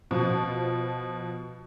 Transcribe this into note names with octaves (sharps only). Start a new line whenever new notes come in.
B2 F3